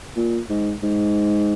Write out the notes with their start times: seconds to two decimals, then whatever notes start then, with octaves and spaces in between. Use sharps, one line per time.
0.16 A#2
0.50 G#2
0.83 G#2